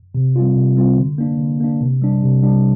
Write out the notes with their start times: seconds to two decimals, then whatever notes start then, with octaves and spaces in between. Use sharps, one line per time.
0.15 C3
0.36 G3 C4 F4
0.56 C3
0.76 G3 C4 F4
0.97 D3
1.18 A#3 D4
1.39 D3
1.60 A#3 D4
1.81 C3
2.02 G3 D4
2.22 C3
2.43 G3 D4